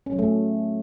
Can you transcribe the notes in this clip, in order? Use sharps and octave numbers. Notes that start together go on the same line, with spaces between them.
C#4
F#3
A3